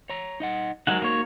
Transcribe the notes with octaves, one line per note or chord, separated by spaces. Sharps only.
C#5 A#5
D#4 D#5 F#5
F#3 G#3 D#4 F#4 A#4 F#5
A#3 C#5